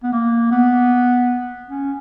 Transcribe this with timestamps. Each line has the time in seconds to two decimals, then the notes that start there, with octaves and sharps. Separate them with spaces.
0.03 B3
0.12 A#3
0.51 B3
1.68 C#4